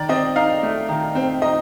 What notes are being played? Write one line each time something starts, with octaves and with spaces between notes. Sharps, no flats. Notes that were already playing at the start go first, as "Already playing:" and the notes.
Already playing: D#3 D5
C4 D#5
D#4 F5
A3
D#3
C4
D#4 D#5